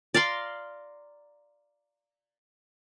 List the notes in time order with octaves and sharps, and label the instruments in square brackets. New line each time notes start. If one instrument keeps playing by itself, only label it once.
[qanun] D5 F5 A#5 C6